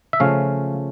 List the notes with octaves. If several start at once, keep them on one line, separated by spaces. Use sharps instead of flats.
E5
C#3 F3 A3 C#4 F5